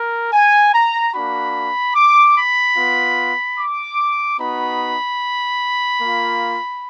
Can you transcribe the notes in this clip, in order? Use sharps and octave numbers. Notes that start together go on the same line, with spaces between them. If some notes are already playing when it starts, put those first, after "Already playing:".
Already playing: A#4
G#5
A#5
A#3 D4 F#4 B5
D6
B5
B3 F4
D6
B3 D#4 F#4 B5
A#3 F4